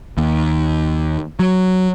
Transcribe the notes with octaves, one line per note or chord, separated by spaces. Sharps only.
D#2
F#3